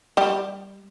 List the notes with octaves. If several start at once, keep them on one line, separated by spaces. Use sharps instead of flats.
G3 G4